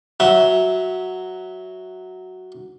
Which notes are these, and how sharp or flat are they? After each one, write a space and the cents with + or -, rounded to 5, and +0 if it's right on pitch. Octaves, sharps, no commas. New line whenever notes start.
F#3 +0 E5 -15